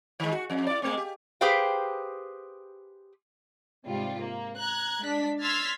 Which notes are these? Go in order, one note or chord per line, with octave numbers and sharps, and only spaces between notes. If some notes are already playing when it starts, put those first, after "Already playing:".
D#3 G#3
F#4
F2
E4 D5
G#3 A3 C4
G4
G4 G#4 B4 C5 F5 G5
G#2 C3 G3 F4
A#3
A#5 F#6 G#6
G#3 D4 B6
C6 E6 F6 G#6 A6 B6